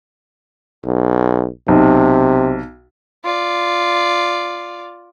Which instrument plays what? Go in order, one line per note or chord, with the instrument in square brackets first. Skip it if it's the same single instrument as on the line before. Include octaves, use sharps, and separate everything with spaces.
[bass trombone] B1
[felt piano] B1 [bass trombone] C3
[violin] F4 D5